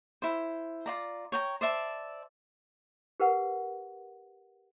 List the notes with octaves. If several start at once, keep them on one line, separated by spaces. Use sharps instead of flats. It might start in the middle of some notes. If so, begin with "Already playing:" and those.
E4 C5
F4 D5 A#5
C#5 G5 A#5
C5 D5 E5 A5
G4 A#4 B4 F#5